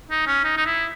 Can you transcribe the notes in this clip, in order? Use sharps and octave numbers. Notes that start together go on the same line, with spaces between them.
D#4
C#4
D#4
D#4
E4